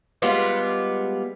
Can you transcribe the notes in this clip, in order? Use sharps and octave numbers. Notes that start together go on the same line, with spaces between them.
G3 G#3 B3 F4